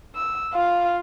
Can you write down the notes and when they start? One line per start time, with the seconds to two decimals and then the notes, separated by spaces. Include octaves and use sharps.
0.16 E6
0.54 F4 F5